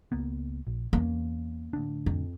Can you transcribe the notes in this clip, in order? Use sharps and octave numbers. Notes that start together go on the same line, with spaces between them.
C#2 A#3 B3
A#1
E2 A#3 C#4
D1 D2 D4
F2